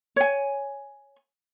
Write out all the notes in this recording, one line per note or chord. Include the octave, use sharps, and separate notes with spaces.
C#5 G#5